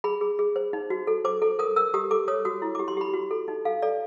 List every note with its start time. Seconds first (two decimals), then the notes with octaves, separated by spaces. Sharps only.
0.04 G#4 B5
0.21 G#4
0.39 G#4
0.56 C5
0.73 D#4
0.90 F#4
1.07 A4
1.25 C5 D6
1.42 A4
1.59 A#4 D#6
1.76 A#4 E6
1.94 G4 D#6
2.11 A4 D6
2.28 C#5 D#6
2.45 F#4 D#6
2.62 E4
2.75 G4 D6
2.88 C6
2.97 G4 B5
3.14 F#4
3.31 A4
3.48 D#4
3.65 A4 F5
3.82 A4 D5